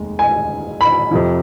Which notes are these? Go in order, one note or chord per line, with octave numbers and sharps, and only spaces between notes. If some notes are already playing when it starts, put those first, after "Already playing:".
Already playing: F1 D#2 G#3
G#5
B5
F2 C3 F3